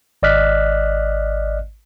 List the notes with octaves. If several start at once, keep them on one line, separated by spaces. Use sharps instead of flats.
G#1 D5 D#5 F6 F#6 B6